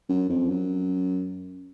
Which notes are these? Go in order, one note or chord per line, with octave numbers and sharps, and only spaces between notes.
F#2
F2
F#2